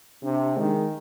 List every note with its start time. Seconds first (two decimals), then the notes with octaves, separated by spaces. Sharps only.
0.22 C3 D4
0.57 D#3 G#3